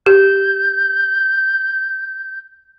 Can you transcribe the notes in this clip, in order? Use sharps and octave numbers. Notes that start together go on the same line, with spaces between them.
G4 G6